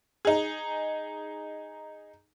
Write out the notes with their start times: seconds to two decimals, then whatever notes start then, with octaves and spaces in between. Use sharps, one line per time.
0.25 D#4 G#4